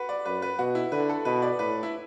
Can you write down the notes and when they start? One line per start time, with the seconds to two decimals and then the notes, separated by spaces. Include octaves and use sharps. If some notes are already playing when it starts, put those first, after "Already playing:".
Already playing: F#4 B4
0.09 D5
0.25 F#2 B4
0.42 B4
0.59 B2 F#4
0.75 E4
0.92 D3 B4
1.09 A4
1.25 B2 B4
1.42 D5
1.59 A2 B4
1.83 E4